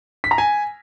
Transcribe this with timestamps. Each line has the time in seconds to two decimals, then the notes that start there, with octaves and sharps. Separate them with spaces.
0.24 B6
0.31 A#5
0.38 G#5